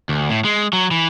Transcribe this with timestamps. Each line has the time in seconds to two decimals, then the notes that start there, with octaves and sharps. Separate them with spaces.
0.09 D2
0.30 A2
0.45 G#3
0.73 F#3
0.91 E3